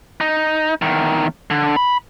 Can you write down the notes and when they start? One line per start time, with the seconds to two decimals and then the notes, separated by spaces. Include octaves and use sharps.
0.21 D#4
0.82 E2 D#3
1.51 D3
1.76 B5